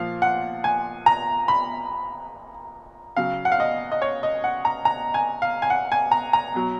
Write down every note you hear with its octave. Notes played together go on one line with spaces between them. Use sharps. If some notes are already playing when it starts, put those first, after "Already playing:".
Already playing: A#2 F3 F5
F#5
G#5
A#5
B5
C#3 F#3 F5
F#5
F5
D#5
D#5
C#5
D#5
F#5
A#5
A#5
G#5
F5
G#5
F#5
G#5
A#5
A#5
B2 F#3